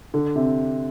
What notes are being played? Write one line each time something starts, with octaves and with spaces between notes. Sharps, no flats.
D3
C3